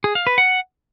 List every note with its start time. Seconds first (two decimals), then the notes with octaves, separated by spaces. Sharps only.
0.04 G#4
0.15 F5
0.27 B4
0.38 F#5